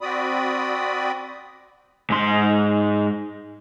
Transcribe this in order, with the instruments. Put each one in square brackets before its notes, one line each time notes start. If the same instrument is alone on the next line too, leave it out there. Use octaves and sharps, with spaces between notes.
[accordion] C4 F#4 D5 B5 D#6
[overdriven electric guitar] G#2 C6